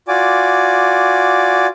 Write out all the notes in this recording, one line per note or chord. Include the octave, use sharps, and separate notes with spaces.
F4 F#4 D5 G#5 D6